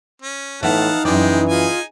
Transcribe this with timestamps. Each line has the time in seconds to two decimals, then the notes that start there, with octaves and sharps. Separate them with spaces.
0.22 C#4
0.63 A2 E3 B3 D#4 F5 F#5 A5
1.05 F#2 E3 G#3 D5 G5
1.49 D#4 F4 G#4 G#5